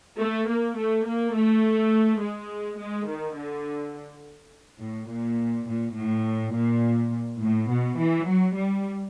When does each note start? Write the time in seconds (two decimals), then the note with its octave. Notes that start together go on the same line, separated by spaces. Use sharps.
0.19 A3
0.47 A#3
0.77 A3
1.05 A#3
1.34 A3
2.21 G#3
2.79 G#3
3.07 D#3
3.37 D3
4.81 A2
5.09 A#2
5.67 A#2
5.96 A2
6.53 A#2
7.41 A2
7.69 B2
7.98 E3
8.26 F#3
8.55 G3